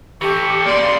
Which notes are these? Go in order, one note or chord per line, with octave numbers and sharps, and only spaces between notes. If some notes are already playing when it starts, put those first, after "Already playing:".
E3 G4 A4 C#6
C#3 A#3 D5 C6